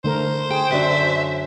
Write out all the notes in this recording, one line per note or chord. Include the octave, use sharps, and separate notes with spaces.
D3 A3 A#4 C5
G#4 G5
F#2 D3 F#4 E5